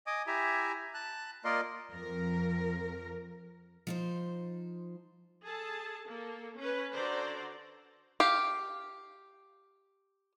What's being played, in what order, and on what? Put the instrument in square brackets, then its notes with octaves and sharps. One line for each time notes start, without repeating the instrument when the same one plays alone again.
[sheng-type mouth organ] D#5 G#5 D6 D#6
E4 G4 E5 G#5 A#5
A5 F#6
A#3 F4 A#4 D5 D#5 C6
[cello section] F2 A#4
[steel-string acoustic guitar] F3 D#4 C5
[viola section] G#4 A4 A5
A#3 A4
C#4 B4
D3 F#4 C5 D5 A#5
[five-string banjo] G4 F5